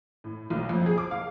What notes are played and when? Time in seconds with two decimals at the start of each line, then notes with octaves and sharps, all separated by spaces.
0.24 A2
0.50 B1
0.69 F2
0.86 G#4
0.98 D6
1.11 F5